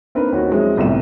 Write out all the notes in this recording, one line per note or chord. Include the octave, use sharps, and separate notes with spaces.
A#3 C4 D4 D#4 A#4 B4
D#2 C#4 D#4 F#4
F3 F#3 G#3 C4 E4
G1 C2 A2 C4 F4 E7